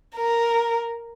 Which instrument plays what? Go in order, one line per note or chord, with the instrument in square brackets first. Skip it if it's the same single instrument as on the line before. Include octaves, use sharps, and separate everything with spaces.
[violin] A#4